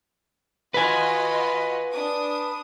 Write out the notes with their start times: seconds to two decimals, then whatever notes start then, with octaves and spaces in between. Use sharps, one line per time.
0.74 F4 F#4 B4 D#5 G#5
1.91 D4 D#6